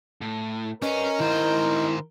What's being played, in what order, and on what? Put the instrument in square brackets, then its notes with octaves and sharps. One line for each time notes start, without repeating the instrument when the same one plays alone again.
[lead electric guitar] A2
[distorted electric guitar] C#4 [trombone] A#4 [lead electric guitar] B4 D5 [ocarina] D#5
[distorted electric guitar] D#3 C5 [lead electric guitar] E4 C6